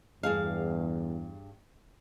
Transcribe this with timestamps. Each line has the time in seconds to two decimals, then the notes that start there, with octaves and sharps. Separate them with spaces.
0.23 E2 G2 G#4 F5